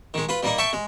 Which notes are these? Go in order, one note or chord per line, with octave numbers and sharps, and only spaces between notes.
D#3 G#3
F4 B4
G3 A#3 D#4
E5 G5 A5 C#6
G#3